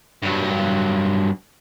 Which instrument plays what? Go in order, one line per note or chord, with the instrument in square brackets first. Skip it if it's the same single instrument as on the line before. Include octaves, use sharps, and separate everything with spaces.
[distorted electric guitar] G2 F#3